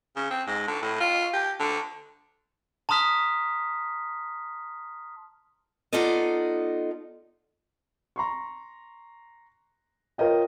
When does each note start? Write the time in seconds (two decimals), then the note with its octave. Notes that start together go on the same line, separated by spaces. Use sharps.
0.16 C#3
0.30 C4
0.47 G#2
0.68 D3
0.82 A2
1.00 F4
1.33 G4
1.60 D3
2.89 A5 A#5 C6 D#6 F6 B6
5.93 B3 D#4 F4 A4 D5 D#5
8.16 A#5 C6 C#6
10.18 F4 A#4 C#5 D#5 G5